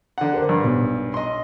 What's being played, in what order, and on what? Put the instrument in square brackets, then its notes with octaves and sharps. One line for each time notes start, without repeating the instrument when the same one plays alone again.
[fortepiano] D3 F#5
[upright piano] G4 A#4 C5
[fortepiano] G2
[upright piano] B1
[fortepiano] D#5 C6